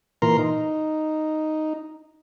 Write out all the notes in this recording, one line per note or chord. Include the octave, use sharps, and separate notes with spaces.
A#2 E3 A#4 A#5 C6
D#4